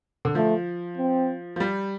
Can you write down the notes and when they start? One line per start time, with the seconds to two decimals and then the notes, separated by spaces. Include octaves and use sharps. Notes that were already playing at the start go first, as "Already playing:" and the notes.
0.25 D3
0.35 F3 A3
0.98 C4
1.56 F3
1.60 G3